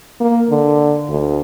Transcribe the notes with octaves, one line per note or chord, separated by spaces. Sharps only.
A#3
D3
D2